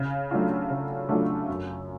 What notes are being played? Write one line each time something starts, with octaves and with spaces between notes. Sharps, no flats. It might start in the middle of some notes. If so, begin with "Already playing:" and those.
Already playing: C#3
F#3 A3 D4 F4
C#3
F#3 A3 D4 F4
F#2